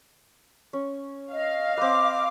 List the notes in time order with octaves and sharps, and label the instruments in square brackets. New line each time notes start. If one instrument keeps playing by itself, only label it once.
[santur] C#4
[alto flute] D#5 [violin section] F5
[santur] C4 B4 [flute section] D6